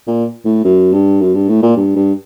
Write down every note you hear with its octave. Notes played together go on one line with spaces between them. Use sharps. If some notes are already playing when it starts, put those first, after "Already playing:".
A#2
A2
F#2
G2
F#2
G2
A2
A#2
G2
G2